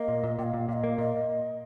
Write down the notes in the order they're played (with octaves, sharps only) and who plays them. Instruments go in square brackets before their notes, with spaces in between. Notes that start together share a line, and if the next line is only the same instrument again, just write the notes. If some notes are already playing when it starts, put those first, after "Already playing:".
Already playing: [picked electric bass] A#3 [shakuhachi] D#5
[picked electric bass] A#2
A#2
[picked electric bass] A#2 [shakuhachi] F5 G5
[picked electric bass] A#2
[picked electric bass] A#2 [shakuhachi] F5
[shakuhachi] D#5
[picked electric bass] A#3
[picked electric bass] A#2 [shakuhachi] D#5